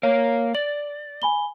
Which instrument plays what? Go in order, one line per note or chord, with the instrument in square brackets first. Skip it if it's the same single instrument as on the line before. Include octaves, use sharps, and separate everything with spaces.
[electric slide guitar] A#3 A#4 F5 [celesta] C#5
[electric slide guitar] D5 [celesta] F#7
[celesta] G#5 B5 G7